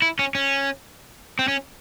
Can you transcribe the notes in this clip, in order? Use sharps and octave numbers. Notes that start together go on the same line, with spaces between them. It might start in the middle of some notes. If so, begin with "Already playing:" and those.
E4
C#4
C#4
C4
C#4